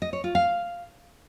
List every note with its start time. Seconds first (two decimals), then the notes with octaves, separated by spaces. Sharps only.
0.02 D#5
0.13 C#5
0.24 F4
0.35 F5